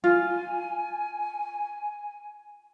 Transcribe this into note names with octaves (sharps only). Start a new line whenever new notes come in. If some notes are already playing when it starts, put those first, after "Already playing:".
F4 G#5